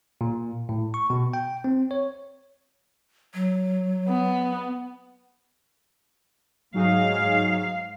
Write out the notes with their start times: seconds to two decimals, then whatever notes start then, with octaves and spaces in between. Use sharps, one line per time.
0.21 A#2
0.69 A2
0.94 C#6
1.10 B2
1.33 G5
1.64 C4
1.91 C#5
3.34 F#3
4.09 B3
6.74 G#2 F#3 D#4 G#4 F5